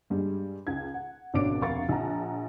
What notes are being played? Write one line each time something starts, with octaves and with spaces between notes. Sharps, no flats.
G2 G3 G#3
C#2 G#6
F#5
G#1 B2 C#4 D4 D6 D7
F1 D2 A#4 F5 C#6 A6
A#1 F#5 A5 A#5